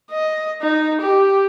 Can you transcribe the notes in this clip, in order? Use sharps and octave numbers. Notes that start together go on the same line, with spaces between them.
D#5
D#4
G4